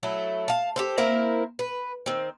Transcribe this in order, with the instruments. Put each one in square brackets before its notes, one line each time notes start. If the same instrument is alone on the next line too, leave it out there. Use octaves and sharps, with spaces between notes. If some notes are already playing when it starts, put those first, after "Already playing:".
[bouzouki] F#3 A3 E4
F5 A5
G4 A4 C5
A#3 C4 E4 A#4
B4
D#3 C4